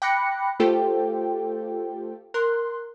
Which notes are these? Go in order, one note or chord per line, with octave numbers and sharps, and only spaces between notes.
G5 B5 D6 F#6 A#6 C#7
A3 F4 G4 A4 C5 G5
A#4 C6 F#6